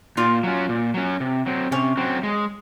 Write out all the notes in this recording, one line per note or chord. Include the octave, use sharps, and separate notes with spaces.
A#2 F4
F#3 C#4
A#2
F#3 C#4
C3
F#3 C4
C3 C#4
F#3 C4
G#3